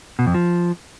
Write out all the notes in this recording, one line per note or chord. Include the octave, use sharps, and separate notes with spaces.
B2
F2
F3